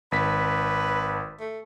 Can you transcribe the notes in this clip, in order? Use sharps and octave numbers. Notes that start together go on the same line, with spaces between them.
G#1 B4 B6
A3